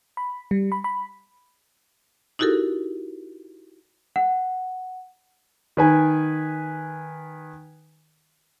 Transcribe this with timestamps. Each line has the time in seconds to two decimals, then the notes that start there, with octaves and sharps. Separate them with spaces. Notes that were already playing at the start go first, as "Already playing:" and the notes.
0.17 B5
0.51 G3
0.72 B5
0.84 B5
2.39 D#4 E4 F#4 G4 A4 A#4
4.16 F#5
5.77 D#3 B4 G#5